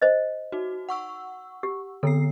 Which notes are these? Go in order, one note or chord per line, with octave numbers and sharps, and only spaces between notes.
C5 D#5
D#4 F#4
F#5 C#6 E6
G4
D3 B3 A4 C7